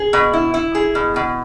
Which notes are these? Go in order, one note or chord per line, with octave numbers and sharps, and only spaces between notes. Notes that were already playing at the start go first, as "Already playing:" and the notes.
Already playing: G#4
B2
E4
E4
G#4
B2
B2